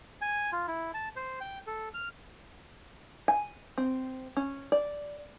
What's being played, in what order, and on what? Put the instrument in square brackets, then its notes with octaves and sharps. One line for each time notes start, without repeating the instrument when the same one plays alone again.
[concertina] G#5
F4
E4
A5
C5
G5
A4
F6
[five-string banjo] G#5
C4
C#4
D5